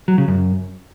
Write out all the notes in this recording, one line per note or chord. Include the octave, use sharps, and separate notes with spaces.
F#3
C#3
F#2